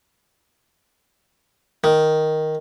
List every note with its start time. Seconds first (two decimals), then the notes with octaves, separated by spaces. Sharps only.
1.84 D#3